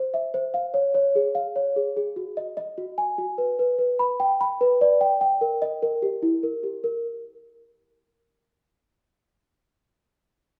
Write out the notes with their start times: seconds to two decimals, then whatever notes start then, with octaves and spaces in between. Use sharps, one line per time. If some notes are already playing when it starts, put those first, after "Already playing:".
Already playing: C5
0.14 E5
0.34 C5
0.54 F5
0.74 C#5
0.94 C#5
1.15 G#4
1.35 F5
1.56 C#5
1.76 G#4
1.97 G#4
2.16 F#4
2.37 D#5
2.57 D#5
2.78 F#4
2.98 G#5
3.18 F#4
3.38 B4
3.59 B4
3.78 B4
3.99 B5
4.20 G5
4.41 B5
4.61 B4
4.81 D5
5.01 G5
5.21 G5
5.41 A#4
5.62 D#5
5.82 A#4
6.02 G4
6.22 E4
6.43 A#4
6.63 G4
6.84 A#4